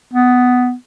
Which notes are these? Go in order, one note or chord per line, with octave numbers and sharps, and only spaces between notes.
B3